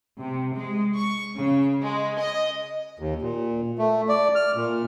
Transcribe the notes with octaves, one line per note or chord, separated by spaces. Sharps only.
C3
G#3
C#6
C#3
G#3
D#5
D#2
A#2
A3
D5
F6
A#2